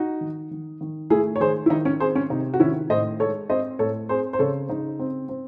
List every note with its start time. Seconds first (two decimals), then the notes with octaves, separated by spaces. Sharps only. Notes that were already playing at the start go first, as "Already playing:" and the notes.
Already playing: D#4 F#4
0.21 D#3
0.51 D#3
0.81 D#3
1.10 A3 E4 G#4
1.36 C#5
1.40 D#3 G#4 C5
1.66 E4
1.70 D#3 D#4
1.85 C#4
2.00 C4 G#4 C5
2.15 C#4
2.30 C3 D#4
2.54 F#4
2.60 D#3 C#4 E4
2.90 A2 C5 D#5
3.20 G#3 A4 C#5
3.49 C4 C5 D#5
3.79 A2 A4 C#5
4.09 C4 G#4 C5
4.33 C5
4.39 C#3 A4 C#5
4.69 C#3 D#4
4.99 C4
5.29 C4